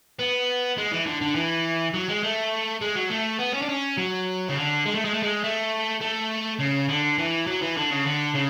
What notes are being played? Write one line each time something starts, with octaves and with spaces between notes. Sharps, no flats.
B3
G#3
E3
D3
D3
E3
F#3
G#3
A3
G#3
F#3
A3
B3
C#4
D4
C#4
F#3
C#3
D3
G#3
A3
G#3
A3
G#3
A3
A3
C#3
D3
E3
F#3
E3
D3
C#3
D3
C#3